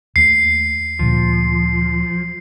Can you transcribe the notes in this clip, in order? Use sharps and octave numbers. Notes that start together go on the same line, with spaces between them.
D#2 A3 C7
D2 A#2 F3